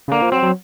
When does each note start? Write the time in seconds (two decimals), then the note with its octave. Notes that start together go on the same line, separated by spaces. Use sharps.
0.08 C#3
0.12 D3 A#3
0.22 F3
0.32 F#3 C4
0.43 F#3